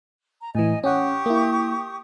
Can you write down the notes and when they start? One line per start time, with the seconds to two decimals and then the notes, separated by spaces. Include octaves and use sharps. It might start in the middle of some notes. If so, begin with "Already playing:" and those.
0.41 A#5
0.55 A2 E3 D#5 G#5
0.84 C#4 G4 F#5 C#6 D#6
1.26 A#3 E4